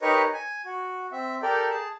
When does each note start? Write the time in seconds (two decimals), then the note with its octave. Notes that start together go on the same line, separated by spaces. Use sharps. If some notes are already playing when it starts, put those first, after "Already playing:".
0.02 D#4 G4 A#4 B4 C#5 D#5
0.33 G#5
0.65 F#4
1.12 C4 E5
1.42 G4 A4 A#4 D5 G5
1.71 G#4 A5